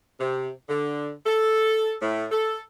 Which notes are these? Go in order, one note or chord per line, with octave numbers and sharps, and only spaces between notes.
C3
D3
A4
A2
A4